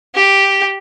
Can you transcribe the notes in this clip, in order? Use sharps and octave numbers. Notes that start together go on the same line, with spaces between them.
G4